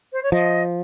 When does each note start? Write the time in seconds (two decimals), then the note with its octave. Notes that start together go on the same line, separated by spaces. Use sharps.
0.13 C5
0.23 C#5
0.32 F3 D#5